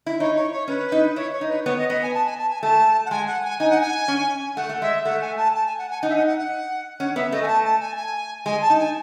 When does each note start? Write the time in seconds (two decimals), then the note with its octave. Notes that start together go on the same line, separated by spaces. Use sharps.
0.06 E4
0.20 D#4 C#5
0.36 C#5
0.52 C#5
0.68 C#4 B4
0.92 D#4
1.16 E4 C#5
1.33 C#5
1.41 D#4
1.49 B4
1.65 B3 C#5
1.78 D#5
1.89 B3 D#5
2.02 G#5
2.14 A5
2.26 G#5
2.38 A5
2.50 G#5
2.63 A3 A5
3.06 F#5
3.11 G#3 G#5
3.27 F#5
3.44 G#5
3.59 D#4 G#5
3.70 F#5
3.81 G#5
4.08 C#4
4.56 A3 F#5
4.69 A3
4.82 G#3 E5
5.05 A3 F#5
5.21 G#5
5.37 A5
5.55 A5
5.66 G#5
5.78 F#5
5.90 G#5
6.02 D#4 F#5
6.10 E5
6.15 F#5
6.27 F#5
6.38 F#5
6.99 C#4 F#5
7.16 B3 E5
7.32 A3 D#5
7.42 G#5
7.48 A5
7.64 A5
7.80 G#5
7.97 G#5
8.45 G#3 G#5
8.62 A5
8.70 D#4
8.79 G#5